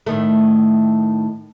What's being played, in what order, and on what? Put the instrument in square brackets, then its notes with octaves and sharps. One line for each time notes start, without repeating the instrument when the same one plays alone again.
[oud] A2 D#3 A3